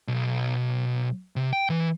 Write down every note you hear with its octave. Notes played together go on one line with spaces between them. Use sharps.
B1
C3
G5
E3